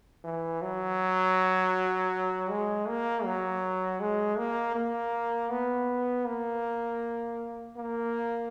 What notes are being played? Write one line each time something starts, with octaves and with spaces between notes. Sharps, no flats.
E3
F#3
G#3
A#3
F#3
G#3
A#3
A#3
B3
A#3
A#3